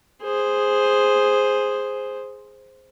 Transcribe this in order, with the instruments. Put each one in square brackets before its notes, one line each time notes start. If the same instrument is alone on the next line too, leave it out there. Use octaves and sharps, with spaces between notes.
[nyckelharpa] G#4 C5